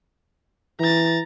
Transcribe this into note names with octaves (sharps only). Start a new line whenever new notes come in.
E3 A#5 A6